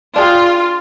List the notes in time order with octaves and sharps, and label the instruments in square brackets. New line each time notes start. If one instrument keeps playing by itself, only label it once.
[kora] D4 G#4 G5 [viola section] F4